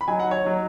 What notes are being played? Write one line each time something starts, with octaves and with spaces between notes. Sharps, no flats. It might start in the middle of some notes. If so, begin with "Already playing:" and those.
B5
F#3 D#4 G#5
F#5
C#5
F#3 D#4